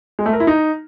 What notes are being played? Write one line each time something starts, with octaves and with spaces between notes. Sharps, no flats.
G#3
A3
A#4
E4
D#4